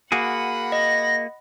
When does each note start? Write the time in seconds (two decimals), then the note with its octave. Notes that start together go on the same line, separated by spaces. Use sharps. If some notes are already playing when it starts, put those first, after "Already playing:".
0.12 A#3 F#4 G#4 F#5 B5
0.72 D#5 A#6